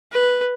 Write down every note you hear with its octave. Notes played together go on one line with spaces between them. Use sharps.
B4